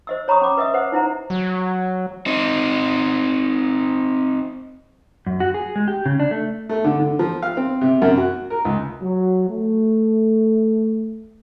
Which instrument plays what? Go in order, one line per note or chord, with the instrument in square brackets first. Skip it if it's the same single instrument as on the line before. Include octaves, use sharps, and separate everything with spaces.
[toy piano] C5 D#5 E6
C#5 A#5 B5 C#6 D#6
C#4 D6
B4 D#5 E5 D#6
B4 C5 F#5
D#4 E4 C5 F#5 A#5
[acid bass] F#3
[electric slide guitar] C4 D#4
F#2
F#4
G#4
G#3
G4
C#3
D4
A3
[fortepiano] A3
D3
D3
F3
F5
C4
C3
F#2
F#4
A#4
C#2
[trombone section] F#3
A3